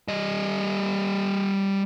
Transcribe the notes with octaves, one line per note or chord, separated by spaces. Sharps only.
G3 D#5